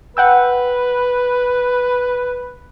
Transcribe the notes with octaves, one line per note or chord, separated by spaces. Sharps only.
B4 F#5 G5 E6